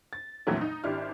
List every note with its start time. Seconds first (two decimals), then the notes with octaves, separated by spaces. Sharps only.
0.13 A6
0.47 A#1 F2 A#2 E3 F#3 A3
0.61 D#4
0.84 G#1 D4 E4 G4 F6